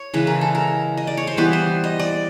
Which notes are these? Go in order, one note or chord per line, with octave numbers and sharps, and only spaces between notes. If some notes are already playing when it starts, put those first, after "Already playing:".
Already playing: C#5
C#3 E3 G#3 B4
A#4
A4
A#4
D#5
D5
C#5
C5
E3 G3 B3 B4
C5
D#5
D5